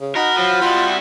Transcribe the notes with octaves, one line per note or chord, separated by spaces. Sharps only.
C#3
D#4 F#4 A#4 B5
F3 F#3
G3 E4 F4